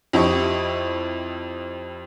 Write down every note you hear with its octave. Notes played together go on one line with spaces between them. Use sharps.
F2 E4 G4 D#5 C#6